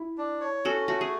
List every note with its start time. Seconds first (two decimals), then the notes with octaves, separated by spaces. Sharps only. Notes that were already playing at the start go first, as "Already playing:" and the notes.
Already playing: E4
0.18 D4
0.41 C#5
0.65 C#4 F#4 A4
0.88 A3 F#4
1.01 G#4